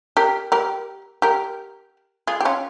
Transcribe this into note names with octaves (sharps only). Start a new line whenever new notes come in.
G4 A#4
G4 A#4
G4 A#4
F4 G#4
G4
C#4 F4